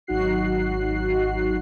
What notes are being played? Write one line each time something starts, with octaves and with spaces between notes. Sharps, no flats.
G#1 F#3 D#4 F#4 F#6 C7